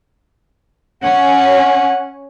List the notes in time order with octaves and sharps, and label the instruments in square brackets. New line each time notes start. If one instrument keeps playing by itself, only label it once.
[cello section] C#4 [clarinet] F#5